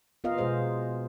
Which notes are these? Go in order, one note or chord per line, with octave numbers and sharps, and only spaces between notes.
B3 F4 A#4 D#5 F5
B2 G#3 G#4 C5 D#5